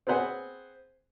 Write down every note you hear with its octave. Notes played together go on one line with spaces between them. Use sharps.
C4 G#4 B4 C5 F#5 G#5